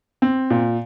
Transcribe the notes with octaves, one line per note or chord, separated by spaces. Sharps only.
C4
A#2